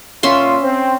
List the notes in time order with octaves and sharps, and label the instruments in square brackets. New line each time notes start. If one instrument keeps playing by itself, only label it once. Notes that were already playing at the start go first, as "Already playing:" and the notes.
[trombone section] A#2 F4 [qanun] C#4 E5 C6
[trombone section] C4